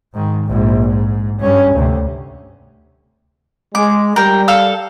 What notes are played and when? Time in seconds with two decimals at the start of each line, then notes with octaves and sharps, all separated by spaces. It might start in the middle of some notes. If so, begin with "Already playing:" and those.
0.13 G#2 D#3
0.46 A#1 G#2
0.86 G#2
1.40 G2 C#4
1.74 D2 C3
3.75 G#3 D6
4.16 G3 A#4 G5
4.48 A4 F5 E6